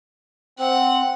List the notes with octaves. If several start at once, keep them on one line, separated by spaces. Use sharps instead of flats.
C4 F#5